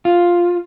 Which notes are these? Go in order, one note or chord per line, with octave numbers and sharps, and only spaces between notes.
F4